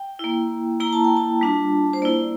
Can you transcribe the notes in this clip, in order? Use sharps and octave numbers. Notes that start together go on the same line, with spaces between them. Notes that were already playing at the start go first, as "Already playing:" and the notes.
Already playing: G5
A#3 E4
A#3 E4 A#5
A5
G5
A5
G3 D4 F4
C5
A#3 E4 D5